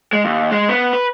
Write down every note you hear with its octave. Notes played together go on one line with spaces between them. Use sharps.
G#3
D#2
G#3
B3
B4